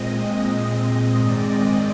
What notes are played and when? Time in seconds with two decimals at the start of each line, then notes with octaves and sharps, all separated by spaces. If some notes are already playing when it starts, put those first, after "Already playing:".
Already playing: A#2 G#3 C4 D#5
1.18 G#2 D#3 G#3 C4 D5